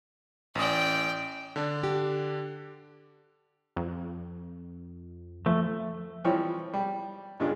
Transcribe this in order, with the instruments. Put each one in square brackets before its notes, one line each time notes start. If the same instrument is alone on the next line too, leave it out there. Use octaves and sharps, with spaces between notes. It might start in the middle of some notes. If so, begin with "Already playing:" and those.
[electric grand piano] A1 C#4 D#6 [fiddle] D5 G5
[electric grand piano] D3 D4
[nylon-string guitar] G4
[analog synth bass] F2
[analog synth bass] F3 [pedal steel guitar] A3
[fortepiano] E3 F3 G3 C4 C#5
G3
G2 C#3 G#3 D4 F4